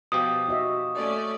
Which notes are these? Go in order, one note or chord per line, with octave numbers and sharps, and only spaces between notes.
B2 F3 G4 D#6
F#4 D#5 E5
A3 C#4 D5